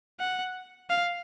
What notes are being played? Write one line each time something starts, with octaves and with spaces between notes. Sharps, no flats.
F#5
F5